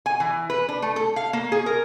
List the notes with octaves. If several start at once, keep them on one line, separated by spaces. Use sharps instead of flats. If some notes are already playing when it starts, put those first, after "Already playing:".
G#5
E3
B4
D4
A3
A4
F5
A#3
G#4
A#4